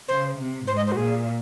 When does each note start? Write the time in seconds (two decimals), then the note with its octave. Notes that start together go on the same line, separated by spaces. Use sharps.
0.08 C#3 C5
0.37 C3
0.67 G#2 C5
0.76 D#5
0.86 C5
0.92 F#4
0.96 A#2 G#4